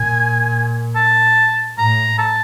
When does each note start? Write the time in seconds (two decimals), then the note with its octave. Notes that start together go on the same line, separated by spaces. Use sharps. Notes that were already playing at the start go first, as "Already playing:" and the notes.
Already playing: A#2 G#5
0.96 A5
1.78 A2 A#5
2.18 A5